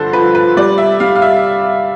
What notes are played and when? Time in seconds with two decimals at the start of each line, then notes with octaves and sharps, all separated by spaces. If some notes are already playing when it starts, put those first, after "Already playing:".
Already playing: G2 D3 F3 A4 C5
0.13 F3 B4
0.35 B4
0.57 G3 D5
0.78 E5
1.00 G3 F5
1.16 F5
1.22 E5